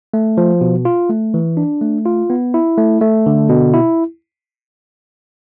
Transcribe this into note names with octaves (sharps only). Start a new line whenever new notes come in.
A3
F3
B2
F4
A3
E3
D4
A3
F4
B3
E4
A3
A3
D3
B2
E4